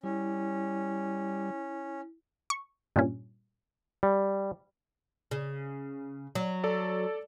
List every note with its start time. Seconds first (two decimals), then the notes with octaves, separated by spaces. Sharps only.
0.03 G3 C#4 E4
2.50 C#6
2.96 G2 A#2 C#4
4.03 G3
5.31 C#3
6.35 F#3
6.64 A4 D5